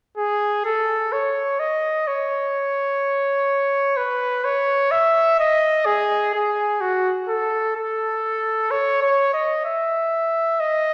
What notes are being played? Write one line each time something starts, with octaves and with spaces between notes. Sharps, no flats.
G#4
A4
C#5
D#5
C#5
B4
C#5
E5
D#5
G#4
G#4
F#4
A4
A4
C#5
C#5
D#5
E5
D#5